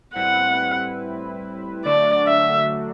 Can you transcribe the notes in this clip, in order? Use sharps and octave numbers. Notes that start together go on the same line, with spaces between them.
A2 G3 C4 E4 B4 F#5
D3 F#3 A3 D4 F#4 D5
E5